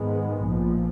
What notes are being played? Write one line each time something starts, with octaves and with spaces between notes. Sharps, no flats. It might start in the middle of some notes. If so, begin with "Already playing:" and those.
Already playing: G#2 D#3 G#3 B3
A#1 A#2 F3